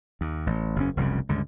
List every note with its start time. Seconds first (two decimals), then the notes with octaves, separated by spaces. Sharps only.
0.21 D#2
0.47 A1
0.76 F#1 E2 C#4
0.97 F1 C2 F#2 C#3
1.29 C#2 G2 D3